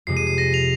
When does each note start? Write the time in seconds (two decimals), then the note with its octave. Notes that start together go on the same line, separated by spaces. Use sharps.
0.07 F2 C3 G#3 C7
0.17 D#7
0.27 C7
0.38 A#6 D#7
0.53 C7 F7